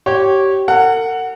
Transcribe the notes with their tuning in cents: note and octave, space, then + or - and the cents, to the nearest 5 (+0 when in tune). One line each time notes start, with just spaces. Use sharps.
G4 -25 C#5 -20
A#4 -45 F#5 +0